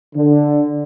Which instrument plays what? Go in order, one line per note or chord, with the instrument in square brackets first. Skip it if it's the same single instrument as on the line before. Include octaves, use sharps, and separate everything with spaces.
[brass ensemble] D3